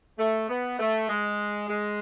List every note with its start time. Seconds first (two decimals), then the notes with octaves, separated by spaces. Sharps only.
0.19 A3
0.50 B3
0.79 A3
1.09 G#3
1.69 G#3